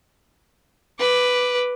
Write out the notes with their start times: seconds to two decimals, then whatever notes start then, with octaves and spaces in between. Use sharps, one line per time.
0.99 B4 D6